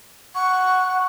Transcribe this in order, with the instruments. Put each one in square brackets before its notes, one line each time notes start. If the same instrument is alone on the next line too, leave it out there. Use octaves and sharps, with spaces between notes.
[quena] F#5 [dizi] C#6